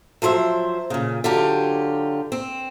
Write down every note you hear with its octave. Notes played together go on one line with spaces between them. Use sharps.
F3 F#3 C5 C#5 E5
A#2 C#3
D3 F#3 F4 G4
C4